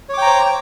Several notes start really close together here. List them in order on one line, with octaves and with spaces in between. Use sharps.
C#5 D6 G5 A#5 C5